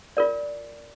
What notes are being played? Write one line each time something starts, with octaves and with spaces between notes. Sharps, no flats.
F4 A#4 D5